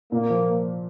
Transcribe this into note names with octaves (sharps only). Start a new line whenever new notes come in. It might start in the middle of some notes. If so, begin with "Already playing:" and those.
A#2 A#3
F3